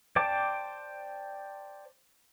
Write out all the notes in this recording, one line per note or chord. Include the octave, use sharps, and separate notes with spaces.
C5 D5 G5 A5 D6